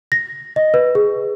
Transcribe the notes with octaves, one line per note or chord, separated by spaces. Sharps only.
A#6
D#5
B4
G#4